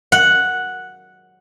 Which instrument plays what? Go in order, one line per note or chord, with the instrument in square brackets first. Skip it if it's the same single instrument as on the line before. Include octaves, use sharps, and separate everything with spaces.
[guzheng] F#5